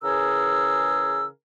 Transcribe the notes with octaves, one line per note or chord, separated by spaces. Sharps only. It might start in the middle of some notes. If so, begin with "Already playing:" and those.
C#3 E3 G#4 A#4 E6